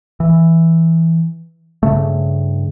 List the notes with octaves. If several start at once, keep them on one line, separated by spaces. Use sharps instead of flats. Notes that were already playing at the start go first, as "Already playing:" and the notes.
E3
G2 C#3 A3